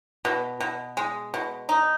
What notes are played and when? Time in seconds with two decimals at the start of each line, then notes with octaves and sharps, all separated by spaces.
0.25 B2
0.60 B2
0.97 G#3
1.34 B2
1.69 D#4